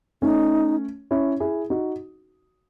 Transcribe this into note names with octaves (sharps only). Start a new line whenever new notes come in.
A3 C#4 D#4
C#4 E4
E4 G#4
D#4 F#4